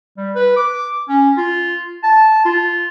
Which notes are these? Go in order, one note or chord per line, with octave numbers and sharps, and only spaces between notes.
G3
B4
D6
C#4
F4
A5
F4